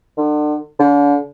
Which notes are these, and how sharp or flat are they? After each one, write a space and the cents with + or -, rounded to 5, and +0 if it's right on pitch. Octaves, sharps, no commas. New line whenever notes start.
D3 +35
D3 -40